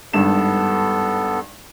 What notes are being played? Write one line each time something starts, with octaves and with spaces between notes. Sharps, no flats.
G#1 G2 B3 A4 E7